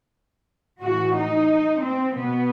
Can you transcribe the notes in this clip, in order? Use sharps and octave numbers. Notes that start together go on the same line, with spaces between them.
A2 E3 F#4
D#4
C4
B2 B3